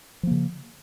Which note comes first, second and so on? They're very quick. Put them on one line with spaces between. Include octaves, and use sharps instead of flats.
F3 A#3 C#3